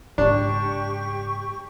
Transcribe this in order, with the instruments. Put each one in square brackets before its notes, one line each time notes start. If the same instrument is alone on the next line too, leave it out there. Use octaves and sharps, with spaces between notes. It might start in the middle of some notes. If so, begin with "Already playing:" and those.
[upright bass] G#2 C#3 [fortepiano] D4 [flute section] G4 C#6